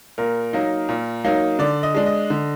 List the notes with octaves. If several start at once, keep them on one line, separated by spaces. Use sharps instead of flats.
A#2 A#4
F#3 A#3 D#4
A#2
F#3 A#3 D#4
D3 D5
D#5
G#3 D4
D#5
D3